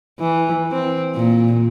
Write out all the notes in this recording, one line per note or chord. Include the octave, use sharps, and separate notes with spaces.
E3
C4
A#2